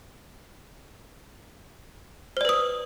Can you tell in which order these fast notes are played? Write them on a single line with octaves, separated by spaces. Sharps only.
C5 D5 B4 D#6